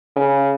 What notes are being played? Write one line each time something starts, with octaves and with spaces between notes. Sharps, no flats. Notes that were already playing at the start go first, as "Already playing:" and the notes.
C#3